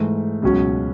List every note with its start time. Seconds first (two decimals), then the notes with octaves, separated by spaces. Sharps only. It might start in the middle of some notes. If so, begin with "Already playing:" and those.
Already playing: G#2 E3 A3
0.42 C#2 B2 F#3 C#4